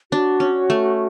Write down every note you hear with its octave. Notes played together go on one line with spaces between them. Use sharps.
D4 F#4
C#4
A3